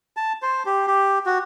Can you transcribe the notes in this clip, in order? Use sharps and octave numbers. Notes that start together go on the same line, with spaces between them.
A5
C5
G4
G4
F#4